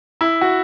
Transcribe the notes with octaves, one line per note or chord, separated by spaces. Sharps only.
E4
F#4